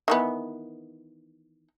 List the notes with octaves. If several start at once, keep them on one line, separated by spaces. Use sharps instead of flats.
D#3 E3 B3